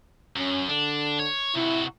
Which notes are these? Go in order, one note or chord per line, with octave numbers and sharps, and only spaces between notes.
F#2 C#4
D3 D4
C#5
C3 E4 F#4